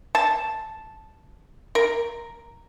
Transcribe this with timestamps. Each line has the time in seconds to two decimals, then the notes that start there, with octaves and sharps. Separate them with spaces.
0.15 A5
1.75 A#4